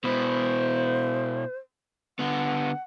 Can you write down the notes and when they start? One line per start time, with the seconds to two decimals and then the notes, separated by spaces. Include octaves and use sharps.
0.04 B2 E4 C5
2.19 D3 B3 F#5